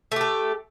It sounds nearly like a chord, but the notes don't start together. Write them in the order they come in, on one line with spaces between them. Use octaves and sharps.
A3 G4 A4